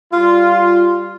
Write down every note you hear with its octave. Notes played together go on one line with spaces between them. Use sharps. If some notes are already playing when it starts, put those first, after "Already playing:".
G3 F4